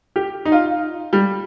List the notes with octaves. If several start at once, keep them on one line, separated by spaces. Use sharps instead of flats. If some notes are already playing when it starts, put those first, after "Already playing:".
G4
D#4
F4
G3